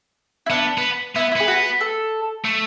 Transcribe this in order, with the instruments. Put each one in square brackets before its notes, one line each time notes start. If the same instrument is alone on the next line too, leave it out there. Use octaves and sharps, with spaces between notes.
[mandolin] E4
[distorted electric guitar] B3 [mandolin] D4
[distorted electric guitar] B3
[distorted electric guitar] B3 [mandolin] E4
[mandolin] E4
[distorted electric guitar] B3 [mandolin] G#4
[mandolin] F#4
A4
[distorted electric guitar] A3